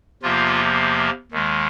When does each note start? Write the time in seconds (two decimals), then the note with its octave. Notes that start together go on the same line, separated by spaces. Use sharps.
0.22 E2 C3 F3 A#3 F4
1.32 D#2 D#3 G#3